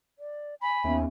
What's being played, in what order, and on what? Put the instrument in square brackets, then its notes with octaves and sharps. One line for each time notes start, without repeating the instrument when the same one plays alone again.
[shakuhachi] D5
[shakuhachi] G#5 [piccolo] B5
[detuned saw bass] D#2 [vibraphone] B3 C#4 E5